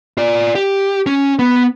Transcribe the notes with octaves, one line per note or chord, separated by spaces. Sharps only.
F4 D5
G4
C#4
B3